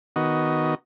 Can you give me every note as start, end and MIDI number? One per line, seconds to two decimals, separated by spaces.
0.16 0.75 51
0.16 0.75 59
0.16 0.75 66
0.16 0.75 75